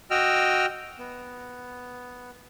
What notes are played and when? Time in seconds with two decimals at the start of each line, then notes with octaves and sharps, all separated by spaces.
0.11 F#4 D#5 G5 E6 F6
0.99 B3